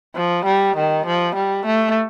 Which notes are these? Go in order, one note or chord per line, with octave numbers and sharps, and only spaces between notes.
F3
G3
D#3
F3
G3
A3